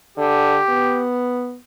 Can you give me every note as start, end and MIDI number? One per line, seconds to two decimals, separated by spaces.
0.18 0.58 50
0.18 1.06 67
0.69 1.57 59